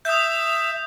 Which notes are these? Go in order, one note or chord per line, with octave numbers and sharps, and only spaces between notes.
E5 D#6 G6